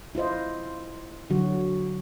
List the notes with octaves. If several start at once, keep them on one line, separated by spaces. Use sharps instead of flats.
E4 F4 C5 D#5
D3 F#3 F#4